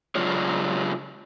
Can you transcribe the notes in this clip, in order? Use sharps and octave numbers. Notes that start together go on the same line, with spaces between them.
C#3 F#3 G#3 D4 F4 C#5